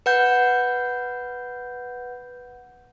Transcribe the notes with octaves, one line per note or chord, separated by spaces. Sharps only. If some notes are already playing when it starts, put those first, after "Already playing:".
B4 F#5 G6